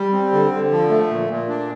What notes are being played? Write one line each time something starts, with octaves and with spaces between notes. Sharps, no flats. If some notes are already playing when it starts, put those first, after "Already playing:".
Already playing: G3
C4
D3
D3
F3
A3
A#2
A#2
D4